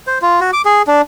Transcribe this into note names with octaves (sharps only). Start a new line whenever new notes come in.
C5
F4
F#4
D6
G#4
D4